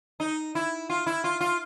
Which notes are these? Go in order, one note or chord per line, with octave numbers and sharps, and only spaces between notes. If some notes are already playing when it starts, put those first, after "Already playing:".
D#4
E4
F4
E4
F4
F4